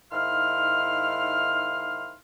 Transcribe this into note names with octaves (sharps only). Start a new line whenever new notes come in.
G#2 D#3 E4 F5 C6 F6